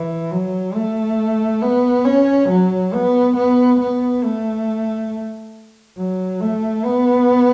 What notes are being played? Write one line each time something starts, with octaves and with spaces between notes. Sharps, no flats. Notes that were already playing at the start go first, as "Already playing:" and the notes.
Already playing: E3
F#3
A3
B3
C#4
F#3
B3
B3
B3
A3
F#3
A3
B3